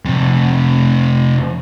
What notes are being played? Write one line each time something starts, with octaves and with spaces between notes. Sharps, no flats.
F2 C3